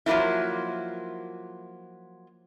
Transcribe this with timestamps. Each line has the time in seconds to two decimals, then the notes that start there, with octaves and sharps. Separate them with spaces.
0.06 F3 F#3 A#3 D#4 E4